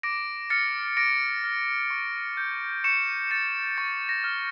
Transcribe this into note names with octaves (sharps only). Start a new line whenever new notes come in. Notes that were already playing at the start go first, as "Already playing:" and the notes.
D6 A#6 D7
F6 A6 C#7
D6 A#6 D7
F6
C#6
G6
C#6 C#7 E7
G6 A6 C#7
C#6 A6
A#6
F6